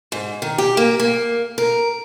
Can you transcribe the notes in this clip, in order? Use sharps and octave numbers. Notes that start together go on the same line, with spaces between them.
G#2
D#3
G4
A#3
A#3
A#4